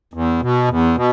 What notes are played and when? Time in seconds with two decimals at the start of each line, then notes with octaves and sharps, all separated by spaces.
0.14 E2
0.42 B2
0.69 E2
0.96 B2